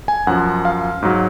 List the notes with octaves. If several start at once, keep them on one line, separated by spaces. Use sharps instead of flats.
G#5
F#2 F3 F#5
F5
G#2 F#3